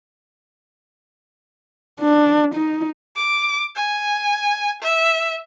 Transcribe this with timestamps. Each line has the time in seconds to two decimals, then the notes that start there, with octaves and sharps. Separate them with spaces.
2.01 D4
2.54 D#4
3.16 D6
3.76 G#5
4.82 E5